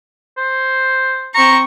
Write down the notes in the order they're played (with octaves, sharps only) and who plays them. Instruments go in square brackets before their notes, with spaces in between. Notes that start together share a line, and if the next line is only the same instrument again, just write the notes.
[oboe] C5
[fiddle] C4 C#6 [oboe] A#5